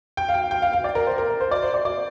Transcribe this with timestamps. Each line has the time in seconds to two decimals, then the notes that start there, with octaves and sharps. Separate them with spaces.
0.17 G5
0.29 F5
0.34 G5
0.51 G5
0.62 F5
0.73 F5
0.84 D5
0.95 A#4
1.07 C5
1.18 A#4
1.30 A#4
1.41 C5
1.51 D5
1.63 C5
1.74 D5
1.85 D5